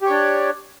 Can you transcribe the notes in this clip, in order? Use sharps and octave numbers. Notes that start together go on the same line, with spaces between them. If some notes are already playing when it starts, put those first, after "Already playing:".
D4 G4 C#5